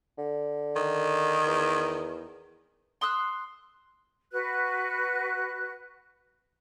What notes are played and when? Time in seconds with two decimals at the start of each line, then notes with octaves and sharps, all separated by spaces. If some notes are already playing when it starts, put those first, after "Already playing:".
0.18 D3
0.76 D#3
1.47 E2
3.01 C6 D#6 E6 F#6
4.31 F#4 B4 F#6